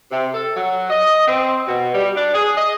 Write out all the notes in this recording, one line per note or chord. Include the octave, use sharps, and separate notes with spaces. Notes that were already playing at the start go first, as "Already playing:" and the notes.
C3
A4
F#3
D#5
C4
B2
G3
D4
G#4
D#5